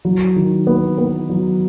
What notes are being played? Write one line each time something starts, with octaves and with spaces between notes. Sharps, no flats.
F#3
D#3
B3
B3
F#3